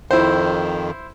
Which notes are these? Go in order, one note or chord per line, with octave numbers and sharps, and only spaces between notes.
F2 D#3 E4 C5